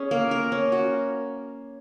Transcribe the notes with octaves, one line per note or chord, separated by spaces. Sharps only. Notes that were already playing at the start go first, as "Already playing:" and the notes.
Already playing: C#4 G#4
A#3
A#4
C#4
F#4